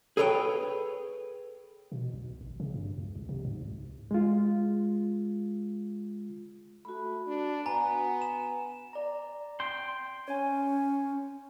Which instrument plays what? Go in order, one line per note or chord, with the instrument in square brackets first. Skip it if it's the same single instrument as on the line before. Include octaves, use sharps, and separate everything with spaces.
[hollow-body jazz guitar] G#4 A4 B4 C#5 F#5 G5
[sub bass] B2
B1
G#1
C#3
G2
C#2
C2
C3
G#2
C#2
[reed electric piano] G#3 F4
[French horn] A3 [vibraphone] F#4 B5
[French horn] D4
[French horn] B3 [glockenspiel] G#5 A#5
[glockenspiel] E7
[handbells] D5 A#5
[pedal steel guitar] G5 C6
[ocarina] C#4 [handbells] C#5 G#5